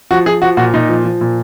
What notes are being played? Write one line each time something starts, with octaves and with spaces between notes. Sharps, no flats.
F3 F#4
F3 G#4
F3 F#4
A#2 F#4
A#2 D#4
F3
F3
A#2